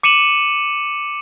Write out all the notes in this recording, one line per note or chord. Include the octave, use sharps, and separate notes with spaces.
D6 C#7 D#7 E7 F#7